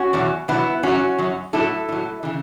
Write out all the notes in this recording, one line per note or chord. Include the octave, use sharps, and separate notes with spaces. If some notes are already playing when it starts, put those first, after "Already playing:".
Already playing: C#4 F#4
E2 B2 F#3
E2 B2 F#3 B3 E4
F#2 F#3 C#4 F#4
F#2 F#3
A2 F#3 E4 A4
A2 F#3
C#3 E3